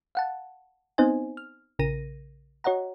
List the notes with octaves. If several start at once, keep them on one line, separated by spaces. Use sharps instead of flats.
F5 F#5 A5
B3 C4 D#4 C5 D#5 G#5
F6
A#1 C#3 A#4 A#6 D#7
F#4 C#5 D#5 F#5 A#5